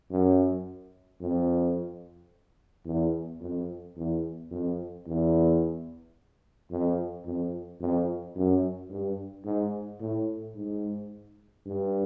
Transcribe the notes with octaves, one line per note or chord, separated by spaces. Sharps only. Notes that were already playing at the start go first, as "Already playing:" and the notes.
F#2
F2
E2
F2
E2
F2
E2
F2
F2
F2
F#2
G2
G#2
A2
G#2
G2